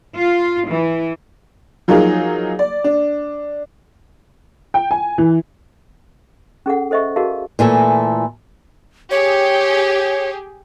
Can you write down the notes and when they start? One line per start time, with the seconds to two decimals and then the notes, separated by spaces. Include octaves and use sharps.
0.16 F4
0.68 E3
1.88 F3 F#3 A#3 D#4 F4 G#4
2.59 D5
2.84 D4
4.74 G5
4.91 G#5
5.18 E3
6.66 C#4 G#4 A4 F#5
6.91 A4 C5 D#5 E5 C#6
7.16 F#4 G#4 A#4 D#5 F5 A5
7.59 A#2 E3 A3 A4
9.11 G4 G#4 C#5